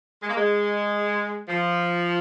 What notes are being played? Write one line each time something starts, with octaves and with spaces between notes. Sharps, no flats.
G#3
A#3
G#3
F3